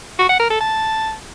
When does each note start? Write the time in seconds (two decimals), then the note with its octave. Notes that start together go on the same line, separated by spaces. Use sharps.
0.19 F#4
0.29 F#5
0.40 A#4
0.50 A4
0.61 A5